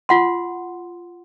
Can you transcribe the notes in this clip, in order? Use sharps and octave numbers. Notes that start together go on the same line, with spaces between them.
F4 F#5 C6